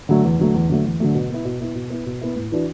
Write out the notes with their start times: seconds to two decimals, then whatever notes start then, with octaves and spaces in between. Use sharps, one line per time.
0.09 D3 F#3 A3
0.24 E2
0.39 D3 F#3 A3
0.55 E2
0.69 D3 F#3 A3
0.85 E2
1.00 D3 F#3 A3
1.15 B2
1.30 B3 E4
1.45 B2
1.60 B3 E4
1.75 B2
1.90 B3 E4
2.06 B2
2.21 B3 E4
2.36 A2
2.52 E3 D4 F#4